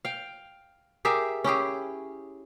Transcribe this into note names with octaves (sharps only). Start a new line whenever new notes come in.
F5 G5
G4 G#4 A#4 E5
C#4 E4 G4 G#4